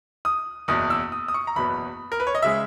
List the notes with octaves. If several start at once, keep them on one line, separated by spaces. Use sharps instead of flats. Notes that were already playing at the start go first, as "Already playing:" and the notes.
D#6
F#1 E2 B2 D#6
E6
D#6
D#6
C#6
A#5
F#1 E2 B2 F#3 B3 B5
A#4
B4
C#5
D#5
C#3 G#3 E5